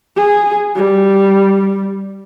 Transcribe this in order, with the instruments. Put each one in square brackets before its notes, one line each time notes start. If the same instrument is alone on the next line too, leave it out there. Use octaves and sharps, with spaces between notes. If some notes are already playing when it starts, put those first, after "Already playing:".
[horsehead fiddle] G#4
G3